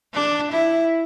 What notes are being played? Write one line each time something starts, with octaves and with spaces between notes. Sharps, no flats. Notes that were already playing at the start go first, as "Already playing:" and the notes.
D4
E4